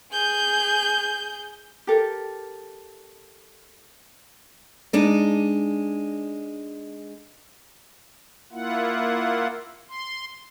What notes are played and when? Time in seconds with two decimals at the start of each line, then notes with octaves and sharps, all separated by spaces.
0.12 G#4 G6
1.87 G4 A4 A#4
4.93 G#3 D4 D#4
8.52 A#3 E4 F4 F#5
9.88 C6